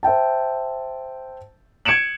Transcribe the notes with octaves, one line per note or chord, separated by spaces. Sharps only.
C5 E5 G5 A5
G#6 C#7 D7 E7 F#7